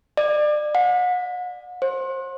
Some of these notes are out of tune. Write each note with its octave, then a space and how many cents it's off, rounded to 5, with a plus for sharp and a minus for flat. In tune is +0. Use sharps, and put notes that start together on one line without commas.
D5 +30
F#5 -40
C5 +35